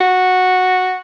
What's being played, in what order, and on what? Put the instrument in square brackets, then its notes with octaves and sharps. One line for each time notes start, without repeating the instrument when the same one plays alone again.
[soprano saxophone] F#4